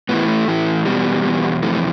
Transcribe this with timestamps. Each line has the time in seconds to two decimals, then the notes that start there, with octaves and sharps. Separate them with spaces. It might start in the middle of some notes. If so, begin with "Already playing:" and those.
0.09 A2 E3 B3
0.28 A3
0.48 A2 E3
0.86 E2 B2 G3
1.25 E2 B2
1.62 F2 C3 E3 A3